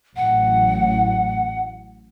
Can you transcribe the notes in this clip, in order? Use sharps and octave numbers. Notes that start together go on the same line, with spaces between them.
A1 F#3 F#5